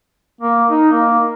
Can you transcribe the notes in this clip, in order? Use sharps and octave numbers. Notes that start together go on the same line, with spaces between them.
A#3
D#4
A#3